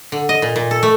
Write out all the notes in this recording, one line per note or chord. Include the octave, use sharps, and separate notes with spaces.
D3
D#5
A#2
A#2
A4
A3